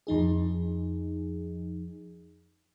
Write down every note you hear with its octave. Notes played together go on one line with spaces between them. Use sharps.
F2 F3 D#4 G#4